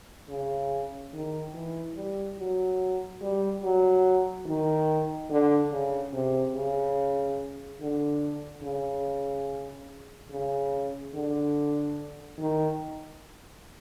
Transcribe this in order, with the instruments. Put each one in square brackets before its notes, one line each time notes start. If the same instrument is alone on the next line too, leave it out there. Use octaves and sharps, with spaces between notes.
[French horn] C#3
D#3
E3
G3
F#3
G3
F#3
D#3
D3
C#3
C3
C#3
D3
C#3
C#3
D3
D#3